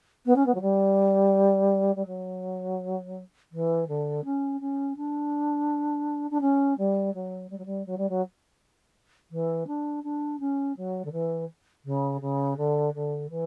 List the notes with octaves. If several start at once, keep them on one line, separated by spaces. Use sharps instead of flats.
B3
C#4
B3
F#3
G3
G3
F#3
E3
D3
C#4
C#4
D4
D4
C#4
G3
F#3
G3
F#3
G3
F#3
G3
F#3
E3
D4
D4
C#4
F#3
D3
E3
C#3
C#3
D3
D3
E3